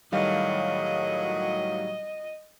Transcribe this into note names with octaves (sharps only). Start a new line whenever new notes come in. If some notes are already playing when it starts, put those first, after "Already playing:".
A2 D#3 F#3 G3 D#5 F5